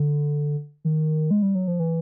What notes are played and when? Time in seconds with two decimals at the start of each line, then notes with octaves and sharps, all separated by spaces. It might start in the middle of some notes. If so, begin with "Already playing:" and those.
Already playing: D3
0.85 D#3
1.31 G#3
1.42 G3
1.55 F#3
1.68 F3
1.80 E3